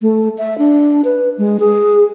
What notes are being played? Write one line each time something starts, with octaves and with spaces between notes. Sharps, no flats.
A3
E5
D4
B4
G#3
G#4